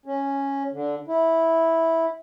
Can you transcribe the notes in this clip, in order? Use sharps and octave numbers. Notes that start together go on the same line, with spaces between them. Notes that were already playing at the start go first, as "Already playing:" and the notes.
C#4
D3
E4